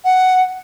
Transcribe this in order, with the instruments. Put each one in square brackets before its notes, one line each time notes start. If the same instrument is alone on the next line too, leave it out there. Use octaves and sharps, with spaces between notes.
[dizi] F#5